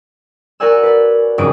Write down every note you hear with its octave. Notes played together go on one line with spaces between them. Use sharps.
F#4 A#4 D5 F#5 G#5 E6
B4 D5
F#1 F2 G#2 F#3 D#6 D7